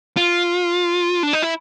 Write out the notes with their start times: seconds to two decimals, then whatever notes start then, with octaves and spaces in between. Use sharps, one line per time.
0.17 F4
1.23 D4
1.33 D#4
1.42 E4